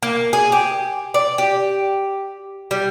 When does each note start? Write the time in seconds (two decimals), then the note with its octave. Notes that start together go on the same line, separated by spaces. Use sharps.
0.03 A#3
0.33 G#4
0.52 G4
1.14 D5
1.38 G4
2.71 G3